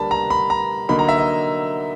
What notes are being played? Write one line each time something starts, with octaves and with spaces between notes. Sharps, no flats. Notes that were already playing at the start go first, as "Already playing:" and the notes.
Already playing: D3 G3 A#3 D4 A5 B5
A#5
B5
A#5
D3 F#3 A#3 D#4 B5
A#5
E5
D#5